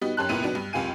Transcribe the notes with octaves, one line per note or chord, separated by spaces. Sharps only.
G3 B3 D#4 F#4
F#2 C#4 G4 A5 C6 F#6
C#2 A#2 B3 E4 D#7
B2 F#3 B3 D4
G2
F#1 C#2 C3 F4 G#5 D#7